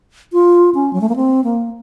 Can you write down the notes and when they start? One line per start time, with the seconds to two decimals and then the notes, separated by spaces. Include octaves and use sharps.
0.33 F4
0.74 C#4
0.93 F#3
1.01 A3
1.09 A#3
1.16 C4
1.44 A#3